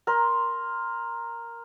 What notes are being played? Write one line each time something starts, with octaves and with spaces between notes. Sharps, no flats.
A#4 C6